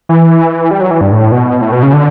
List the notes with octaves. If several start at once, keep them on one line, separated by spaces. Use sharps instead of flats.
E3
G3
F#3
E3
G2
A2
B2
A2
B2
C#3
D3